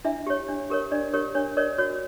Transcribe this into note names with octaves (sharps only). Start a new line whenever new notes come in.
D4 E4 E5
G4 C#5
D4
G4 A#4 C#5
D4 D5
G4 A#4 C#5
D4 C#5
A#4 C#5 D5
F#4 C#5